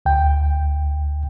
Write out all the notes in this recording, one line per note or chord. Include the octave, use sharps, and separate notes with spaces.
D2 G5